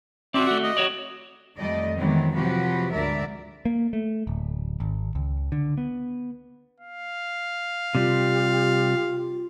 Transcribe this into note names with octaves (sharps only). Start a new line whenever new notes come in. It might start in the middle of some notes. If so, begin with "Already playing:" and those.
C4 E4 F#4 D5 E5
A3 F#4
D#5
F#4 C#5 D5
F2 D#3 G3 A3 D5 D#5
D#3 E3 F#3 G#3 B3 C4
C3 F3 F#3 F#4 G4 B4
D2 G#2 A#4 D5 E5
A#3
A3
D1
G#1
C#2
D3
B3
F5
C3 G3 F4 G4